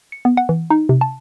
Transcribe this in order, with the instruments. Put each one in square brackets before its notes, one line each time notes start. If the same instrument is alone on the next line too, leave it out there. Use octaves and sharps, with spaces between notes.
[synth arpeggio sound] C#7
B3
F#5
E3
D#4
C3
A5